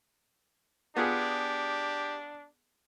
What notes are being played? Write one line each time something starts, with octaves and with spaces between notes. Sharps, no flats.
B3 D4 F4 G4 G#4